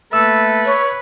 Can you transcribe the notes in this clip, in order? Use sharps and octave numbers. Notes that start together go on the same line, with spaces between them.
A3 A#3 A4 B4 E6
C#5